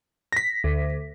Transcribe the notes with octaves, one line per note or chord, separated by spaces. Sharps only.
A#6 B6
D2